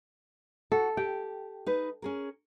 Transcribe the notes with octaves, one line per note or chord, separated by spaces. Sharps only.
F#4 A4
G4 G5
D#4 B4
C#4 G#4 A#4